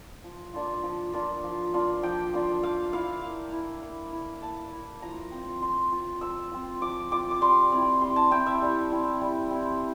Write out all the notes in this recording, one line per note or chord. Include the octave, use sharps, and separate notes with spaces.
F3
A#3 D4 F4
F3
A#3 D4 F4
F3
A#3 D4 F4
F3 G5
A#3 D4 F4
A#3 F5
E4 F5
A#3
E4
A#3
E4
A#3 A5
E4
F3 A#5
C4
F4
F3 C6
C4 F4
F3 E6
C4 F4
F3 D6
C4 F4 D6
D6
G3 C6
C4 E4
G3 C6
A5
C4 E4 G5
E5
G3
C4 E4
G3
C4 E4